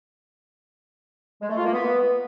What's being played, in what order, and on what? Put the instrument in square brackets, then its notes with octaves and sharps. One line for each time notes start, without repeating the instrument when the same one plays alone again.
[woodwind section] G#3
A3
F4
A#3
B3